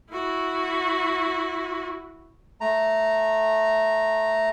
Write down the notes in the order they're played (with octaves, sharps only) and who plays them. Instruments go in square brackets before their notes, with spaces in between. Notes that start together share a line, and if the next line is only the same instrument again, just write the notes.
[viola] E4 F#4
[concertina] A3 A#5